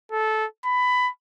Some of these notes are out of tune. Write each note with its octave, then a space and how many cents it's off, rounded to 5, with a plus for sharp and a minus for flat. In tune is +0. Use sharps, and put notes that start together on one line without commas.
A4 -15
B5 +15